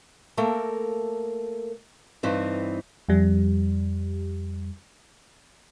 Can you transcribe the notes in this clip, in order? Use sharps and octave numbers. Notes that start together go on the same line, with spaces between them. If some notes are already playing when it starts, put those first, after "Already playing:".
A3 A#3 A4 A#4
G2 E3 C4 D#4
F2 G3